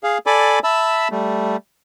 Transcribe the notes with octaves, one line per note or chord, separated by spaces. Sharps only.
G#4 F5
A4 D5 G#5 B5 D6
E5 A5 B5 E6
G3 A3